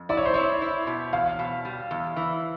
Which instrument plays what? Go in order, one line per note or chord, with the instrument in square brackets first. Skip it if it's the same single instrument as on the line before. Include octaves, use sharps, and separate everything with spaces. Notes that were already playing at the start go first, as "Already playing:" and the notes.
Already playing: [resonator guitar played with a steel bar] F2
[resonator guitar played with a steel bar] E4 [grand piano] D5
[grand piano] C#5
C5
[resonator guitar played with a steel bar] E4 [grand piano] C#5
[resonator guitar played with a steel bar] E4
B2
[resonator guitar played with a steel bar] E2 [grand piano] F5
[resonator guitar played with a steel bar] B2
G3
E2
E3